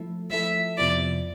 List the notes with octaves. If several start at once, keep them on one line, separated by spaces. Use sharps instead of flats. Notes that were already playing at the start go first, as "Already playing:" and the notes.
Already playing: F3 A3 E4 A4
F3 A3 E4 A4 E5
F2 C3 F3 B3 E4 D5